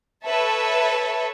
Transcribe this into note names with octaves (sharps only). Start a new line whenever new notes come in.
A4 B4 C#5 E5 A5